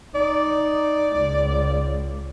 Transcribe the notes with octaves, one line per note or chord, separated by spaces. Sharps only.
D#4 D5
C#2